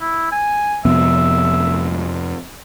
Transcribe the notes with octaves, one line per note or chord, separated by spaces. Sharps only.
E4
G#5
F2 C3 B3 E5